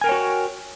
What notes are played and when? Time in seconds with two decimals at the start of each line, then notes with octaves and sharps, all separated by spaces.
0.01 G#5
0.04 A#4
0.07 G5
0.09 C#5
0.12 F#4